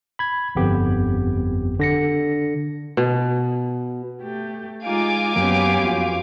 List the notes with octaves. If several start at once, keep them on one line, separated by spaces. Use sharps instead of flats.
B5 G#6
G1 F2 B3 G4
D3 A#6 C#7
B2
A3 G4
G#3 D#4 F4 F5 G#5 D6
F#2 F#3 A#3 B3 C#4 G4
F2 F4 F#4